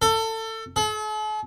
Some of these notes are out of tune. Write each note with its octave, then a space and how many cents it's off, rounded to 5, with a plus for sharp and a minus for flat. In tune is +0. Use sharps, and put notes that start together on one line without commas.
A4 +25
A4 -45